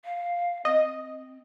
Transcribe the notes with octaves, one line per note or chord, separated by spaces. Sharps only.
F5
C4 D#5